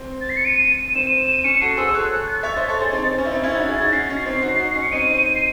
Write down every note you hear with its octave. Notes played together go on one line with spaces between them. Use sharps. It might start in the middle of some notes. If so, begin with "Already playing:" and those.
Already playing: C4
A6
C7
C#7
D#7
C4 E7
D#7
E7
D#7
C#4 C#7
F#4 A4 C7
G#4 C5 E6
C5
A4 C#5 F#6
F#6
A6
C#5 E5
C5 D#5
A4 C#5
G#4 C5
C4 D#4
C4
C#4
E4
C4 D#4
C#4 E4 G#6
A6
D#4 F#4 G#6
E4 G#4
D#4 F#4 A6
C#4 C7
A6
C#4
C7
C4 D#4
D#4 F#4
D#4 F#4
C#4
C#7
C4 D#4 D#7
C7